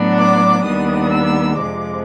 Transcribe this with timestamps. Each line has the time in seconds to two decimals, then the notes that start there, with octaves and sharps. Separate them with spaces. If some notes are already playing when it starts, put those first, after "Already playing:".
Already playing: A2 F#3 B3 D4
0.19 D6
0.65 D#2 D#3 G3 B3 D4 D#6
1.10 E6
1.57 F2 C3 F3 G#3 D6